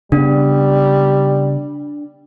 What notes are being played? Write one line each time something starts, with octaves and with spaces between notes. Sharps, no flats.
C#3 G3 B3 D4